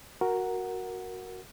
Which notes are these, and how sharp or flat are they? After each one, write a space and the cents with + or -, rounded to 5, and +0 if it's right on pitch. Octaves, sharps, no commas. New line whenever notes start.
F#4 +0 A#4 +0 F#5 +0